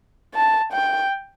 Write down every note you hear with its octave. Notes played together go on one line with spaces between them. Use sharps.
A5
G5